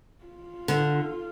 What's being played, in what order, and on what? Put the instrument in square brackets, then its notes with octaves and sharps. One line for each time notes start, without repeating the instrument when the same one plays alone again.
[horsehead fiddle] F4
[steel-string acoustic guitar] D3